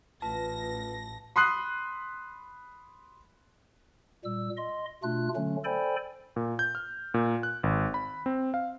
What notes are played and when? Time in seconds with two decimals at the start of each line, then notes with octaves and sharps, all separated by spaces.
0.22 A1 F4 B4 A5 A#6
1.36 B5 C6 D#6 F#6 C7
4.25 A#2 G3 E6
4.57 D#5 C6
5.03 B2 A3 D4 F4 F#6
5.36 D3 F#3 A3 C#4
5.64 A4 C5 D5 G5 G#5 B5
6.36 A#2
6.59 G6
6.75 F6
7.14 A#2
7.43 F#6
7.63 G#1
7.94 B5
8.26 C4
8.54 F5